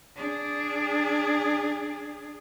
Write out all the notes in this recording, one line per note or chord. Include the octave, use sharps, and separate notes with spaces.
D4 G#4